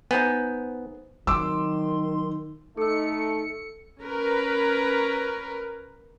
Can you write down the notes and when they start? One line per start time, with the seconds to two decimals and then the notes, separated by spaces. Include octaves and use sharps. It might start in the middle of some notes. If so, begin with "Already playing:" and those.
0.11 B3 D#4 C5 G#5
1.27 D#3 F#3 C4 C6 D6 E6
2.77 A3 D#4 A4 E6 C#7
4.02 C#4 A#4 B4